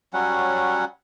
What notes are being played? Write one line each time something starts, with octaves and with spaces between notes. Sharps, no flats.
F#3 G3 C#4 F#5